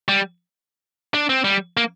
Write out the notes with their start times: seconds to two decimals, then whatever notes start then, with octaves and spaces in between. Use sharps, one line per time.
0.09 G3
1.14 D4
1.29 C4
1.44 G3
1.77 A#3